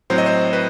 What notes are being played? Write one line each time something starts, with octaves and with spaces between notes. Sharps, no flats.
A2 F#3 C4 C5
D#5
C5
B4